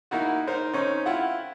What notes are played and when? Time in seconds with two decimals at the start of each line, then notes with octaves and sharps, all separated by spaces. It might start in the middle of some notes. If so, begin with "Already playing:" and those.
0.11 A#3 D#4 E4 F#4
0.47 D#4 A#4 C5
0.74 C4 C#4 D#4
1.06 E4 F4 F#5 G5